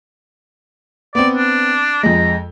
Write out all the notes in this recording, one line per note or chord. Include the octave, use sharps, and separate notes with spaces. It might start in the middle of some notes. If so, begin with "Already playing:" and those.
B3 C4 D5
D4
F2 G#3 A#5